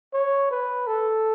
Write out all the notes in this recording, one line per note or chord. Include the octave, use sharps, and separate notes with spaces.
C#5
B4
A4